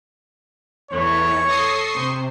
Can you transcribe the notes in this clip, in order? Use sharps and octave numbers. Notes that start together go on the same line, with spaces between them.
E2 E3 A3 C#5
A4 C#6 D#6 A#6 C7
C3 C5